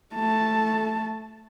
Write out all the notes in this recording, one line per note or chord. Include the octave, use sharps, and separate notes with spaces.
A3 A5